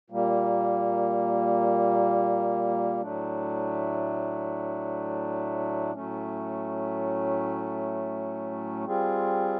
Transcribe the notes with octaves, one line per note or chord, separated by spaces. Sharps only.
A#2 G3 A#3
A2 F#3 A3 D4
A2 F#3 A3 C#4
G3 C4 F4 G#4